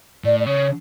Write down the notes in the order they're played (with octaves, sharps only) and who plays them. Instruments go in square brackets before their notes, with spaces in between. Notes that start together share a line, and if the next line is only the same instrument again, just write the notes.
[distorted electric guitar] A2 [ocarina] D5
[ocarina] D5
[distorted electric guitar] C#3 [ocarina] C#5